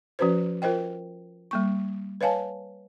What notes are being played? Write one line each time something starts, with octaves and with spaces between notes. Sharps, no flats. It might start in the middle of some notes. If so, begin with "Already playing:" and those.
F3 C#4 F#4 B4 C5
F4 A#4 C5 D#5 G5
G3 A#3 C#6
B4 C#5 D#5 F5 G#5 A5